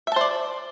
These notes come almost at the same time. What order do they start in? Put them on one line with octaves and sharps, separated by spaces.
E5 A5 C5 D5